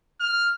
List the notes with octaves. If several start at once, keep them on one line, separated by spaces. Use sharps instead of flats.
F6